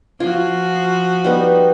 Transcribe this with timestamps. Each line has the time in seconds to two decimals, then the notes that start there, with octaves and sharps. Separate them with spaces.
0.20 F3 F4 F#4
1.24 G3 B3 D#4